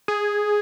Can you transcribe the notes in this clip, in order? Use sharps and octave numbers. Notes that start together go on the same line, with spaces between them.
G#4